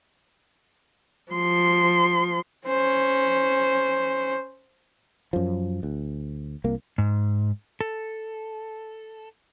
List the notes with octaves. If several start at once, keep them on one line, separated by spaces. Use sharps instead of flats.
F3 C6
C#4 C5
F#2 F3
D2
C2 A#3
G#2
A4